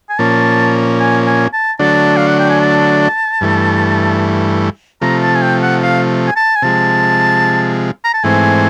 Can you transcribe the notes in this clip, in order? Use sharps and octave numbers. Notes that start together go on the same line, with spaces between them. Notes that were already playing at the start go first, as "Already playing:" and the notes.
G#5
A#2 F3 A#3 C#4 A5
G#5
G#5
A5
D3 F#3 A3 D4 A5
F5
F#5
G5
G#5
A5
G2 E3 A3
C3 F3 A3 A#5
A5
G#5
G5
F#5
F5
G#5
A5
G#5
C3 F3 G#3 A5
A#5
A5
G#2 E3 A3 C4 G#5